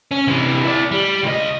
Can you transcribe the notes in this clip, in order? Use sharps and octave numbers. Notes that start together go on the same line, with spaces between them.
C#4
C3 E3
E4 D5
G3
C#2 D#5